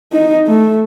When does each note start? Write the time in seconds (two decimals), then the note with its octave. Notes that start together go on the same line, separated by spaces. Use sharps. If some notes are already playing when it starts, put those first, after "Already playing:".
0.13 D#4
0.47 A3